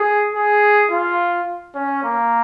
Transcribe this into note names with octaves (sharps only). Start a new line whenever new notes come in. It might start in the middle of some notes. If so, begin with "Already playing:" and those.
Already playing: G#4
G#4
F4
C#4
A#3